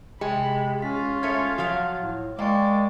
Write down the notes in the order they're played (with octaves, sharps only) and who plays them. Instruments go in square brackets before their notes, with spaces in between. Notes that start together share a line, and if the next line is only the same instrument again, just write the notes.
[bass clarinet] C3 [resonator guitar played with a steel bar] G#3 [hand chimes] G4 D#5 G5 [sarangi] B5
[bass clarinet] C#4 [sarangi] F4 [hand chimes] B6
[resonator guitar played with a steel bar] G#3 A3 C#5 [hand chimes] G#6 B6 C#7
[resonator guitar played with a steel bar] F3 F#3 F5 [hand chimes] F#4
[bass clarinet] A2
[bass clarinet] G#3 [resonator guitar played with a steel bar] A#3 [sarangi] D5 [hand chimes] F5 G5 C#6